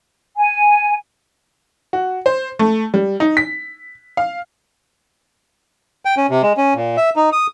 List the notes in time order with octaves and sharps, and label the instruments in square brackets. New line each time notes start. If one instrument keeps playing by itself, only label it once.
[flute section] G#5
[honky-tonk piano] F#4
C5
A3
G3
D#4
B6
F5
[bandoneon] G5
C#4
C3
G#3
C#4
A#2
E5
D#4
D#6